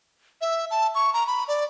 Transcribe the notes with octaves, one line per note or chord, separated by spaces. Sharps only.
E5
A5
C#6
A#5
B5
D5